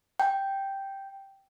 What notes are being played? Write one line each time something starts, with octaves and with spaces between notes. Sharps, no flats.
G5